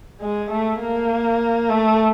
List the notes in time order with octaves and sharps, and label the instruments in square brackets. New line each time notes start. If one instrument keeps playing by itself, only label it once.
[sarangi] G#3
A3
A#3
A3